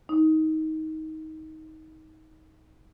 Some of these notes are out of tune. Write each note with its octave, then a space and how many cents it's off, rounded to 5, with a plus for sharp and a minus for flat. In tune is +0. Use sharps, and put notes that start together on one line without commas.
D#4 +20